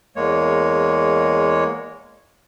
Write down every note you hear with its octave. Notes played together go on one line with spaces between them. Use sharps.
E2 G#3 A#3 C#5